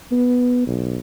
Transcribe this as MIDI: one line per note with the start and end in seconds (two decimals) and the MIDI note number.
0.12 0.64 59
0.67 0.99 35